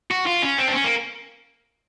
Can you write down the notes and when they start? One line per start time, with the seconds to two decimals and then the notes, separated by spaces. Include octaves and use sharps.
0.11 F#4
0.27 F4
0.42 C#4
0.58 C4
0.68 D4
0.74 C#4
0.85 A#3